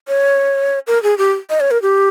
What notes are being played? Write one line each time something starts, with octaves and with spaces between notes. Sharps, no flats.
C#5
A#4
G#4
G4
D#5
C#5
A#4
G4